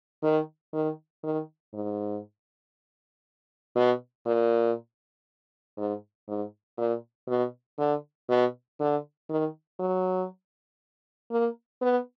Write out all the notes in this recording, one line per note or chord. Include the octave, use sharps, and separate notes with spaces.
D#3
D#3
D#3
G#2
B2
A#2
G#2
G#2
A#2
B2
D3
B2
D3
D#3
F#3
A#3
B3